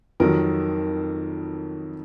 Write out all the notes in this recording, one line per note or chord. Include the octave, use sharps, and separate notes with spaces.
F2 D#3 F#3 A#4